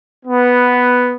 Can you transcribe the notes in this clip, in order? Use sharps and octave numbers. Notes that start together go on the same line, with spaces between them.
B3